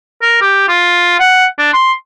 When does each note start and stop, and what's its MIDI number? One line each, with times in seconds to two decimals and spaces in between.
0.22 0.39 70
0.41 0.67 67
0.69 1.19 65
1.19 1.46 78
1.58 1.72 62
1.73 1.92 84